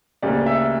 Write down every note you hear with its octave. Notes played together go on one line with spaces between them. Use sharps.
D2 C#3 G3 A#3 D5
E5